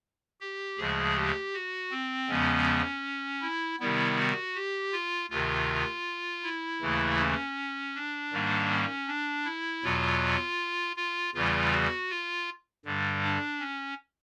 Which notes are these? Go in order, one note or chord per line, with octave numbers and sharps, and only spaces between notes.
G4
D2 C#3 F3 G#3 G#4
G4
F#4
C4
E2 C#3 F3 G#3 B3 C#4
E4
C3 D#3 G3 B3 E4
F#4
G4
F4
D2 C3 D#3 F4
E4
D#2 C#3 E3 A3
C#4
D4
G#2 D#3 G3 A#3
C#4
D4
E4
E2 B2 F#3 F4
F4
E2 C#3 E3 G3 F4
F#4
F4
G2 D3 G3
D4
C#4